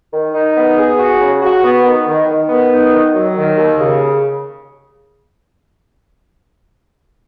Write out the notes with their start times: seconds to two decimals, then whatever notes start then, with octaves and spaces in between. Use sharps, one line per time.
0.13 D#3
0.34 D#4
0.56 B3
0.78 G#4
0.99 F#4
1.20 C#3
1.42 F#4
1.63 B3
1.85 D#3
2.07 D#3
2.27 D#3
2.49 B3
2.71 D#4
2.92 D#3
3.14 F#3
3.36 D#3
3.56 D#2
3.78 C#3